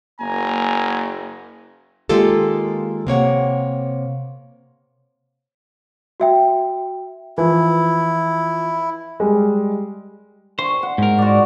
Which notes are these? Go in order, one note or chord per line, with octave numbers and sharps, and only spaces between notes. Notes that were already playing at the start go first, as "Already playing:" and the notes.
F#1 A#3 G#5 A#5
D#3 G#3 A#3 F4 G4 A4
C3 A#3 C#5 F#5
F#4 E5 G5
E3 F3 E4
G3 G#3
C5 C#6
F#5
G#2 A#4
F#4 D5